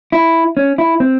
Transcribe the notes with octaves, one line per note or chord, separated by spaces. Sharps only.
E4
C#4
E4
C4